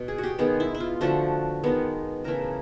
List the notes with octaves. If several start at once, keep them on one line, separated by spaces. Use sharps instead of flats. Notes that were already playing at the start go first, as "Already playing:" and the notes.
Already playing: B2
G#4
F#4
G4
D#3 G#3 B3 G#4
E4
E4
F4
D3 F3 A3 F#4
D#3 G#3 B3
C#3 E3 A3 A#4